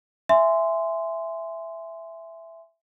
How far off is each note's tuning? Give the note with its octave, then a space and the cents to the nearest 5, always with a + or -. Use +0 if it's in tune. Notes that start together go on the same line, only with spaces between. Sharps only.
E5 +5 G#5 +0 C6 -10